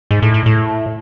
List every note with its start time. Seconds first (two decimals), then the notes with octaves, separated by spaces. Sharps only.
0.11 G#2
0.22 A2
0.34 A2
0.46 A2